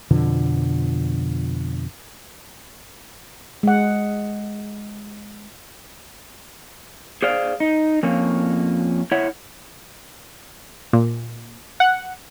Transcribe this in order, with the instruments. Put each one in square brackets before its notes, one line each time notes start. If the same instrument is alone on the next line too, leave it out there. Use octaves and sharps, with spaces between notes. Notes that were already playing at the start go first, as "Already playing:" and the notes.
[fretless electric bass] F2 B2 D3 F3
[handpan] G#3 F#5
[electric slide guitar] G#4 C5 D5 F5
D#4
F2 A#3 C#4
E4 C#5 E5 F#5
[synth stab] A#2
F#5